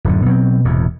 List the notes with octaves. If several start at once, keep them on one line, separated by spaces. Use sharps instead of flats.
D1 F#2 D3
B2 F#3 G3 C4
E1 E2 A2 C3